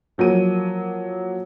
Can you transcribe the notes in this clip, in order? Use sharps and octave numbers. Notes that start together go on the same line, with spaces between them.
F3 F#3 A#3 D#7